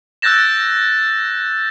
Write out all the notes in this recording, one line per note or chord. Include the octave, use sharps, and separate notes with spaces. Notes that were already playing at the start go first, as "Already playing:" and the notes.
E6 F#6 G6 A6 A#6 E7